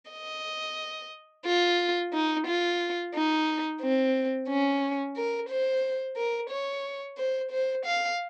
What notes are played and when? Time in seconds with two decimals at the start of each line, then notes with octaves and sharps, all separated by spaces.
0.11 D#5
1.46 F4
2.13 D#4
2.47 F4
3.14 D#4
3.81 C4
4.48 C#4
5.16 A#4
5.49 C5
6.17 A#4
6.50 C#5
7.18 C5
7.51 C5
7.86 F5